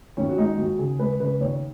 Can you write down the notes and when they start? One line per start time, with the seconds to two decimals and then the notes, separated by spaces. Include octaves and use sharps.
0.17 D#2 C#4
0.29 F#4
0.38 G#3 D#4
0.58 D#2 F#4
0.79 C#3 G#4
0.99 G#3 B4
1.20 C#3 B4
1.40 D#2 C#5